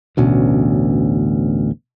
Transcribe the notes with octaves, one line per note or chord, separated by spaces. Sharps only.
A1 D2 B2 C#4